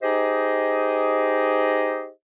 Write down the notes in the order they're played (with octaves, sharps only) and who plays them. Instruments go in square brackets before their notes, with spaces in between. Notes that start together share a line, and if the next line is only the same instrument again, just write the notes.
[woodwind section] D#4 G4 G#4 C5 D#5